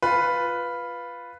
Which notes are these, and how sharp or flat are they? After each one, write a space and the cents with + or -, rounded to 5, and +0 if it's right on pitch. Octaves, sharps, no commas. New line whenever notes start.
F4 +0 B4 +0